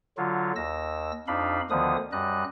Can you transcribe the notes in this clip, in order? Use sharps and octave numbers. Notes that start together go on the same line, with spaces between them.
D3 F#3 F4
D#2 E6 A#6
F2 D4 D#4 F5 B5
D2 D3 D#3 F3 B3 D#6
F#2 G3 D#5 F#6